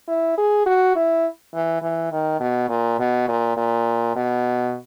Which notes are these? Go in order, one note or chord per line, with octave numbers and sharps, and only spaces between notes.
E4
G#4
F#4
E4
E3
E3
D#3
B2
A#2
B2
A#2
A#2
B2